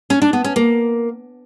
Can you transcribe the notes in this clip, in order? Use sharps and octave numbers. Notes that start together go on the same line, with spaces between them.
C#4
D4
B3
C#4
A#3